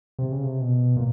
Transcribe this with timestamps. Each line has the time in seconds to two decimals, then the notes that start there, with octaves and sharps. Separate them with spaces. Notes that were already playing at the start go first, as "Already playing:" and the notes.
0.19 C3
0.32 C#3
0.43 C3
0.61 B2
0.97 A#2